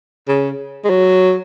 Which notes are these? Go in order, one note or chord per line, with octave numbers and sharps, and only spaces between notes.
C#3
G#3
F#3